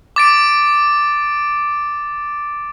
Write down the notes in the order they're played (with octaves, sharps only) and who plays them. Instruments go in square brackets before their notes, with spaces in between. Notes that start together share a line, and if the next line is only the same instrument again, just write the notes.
[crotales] D6 A6 D7